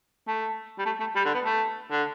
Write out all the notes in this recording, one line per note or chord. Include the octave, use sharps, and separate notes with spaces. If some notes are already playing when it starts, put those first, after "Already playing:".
A3
G3
A3
A3
G3
D3
B3
A3
D3